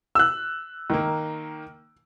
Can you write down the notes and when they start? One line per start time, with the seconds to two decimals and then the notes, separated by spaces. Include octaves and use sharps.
0.15 E6 F#6
0.90 D#3 A#3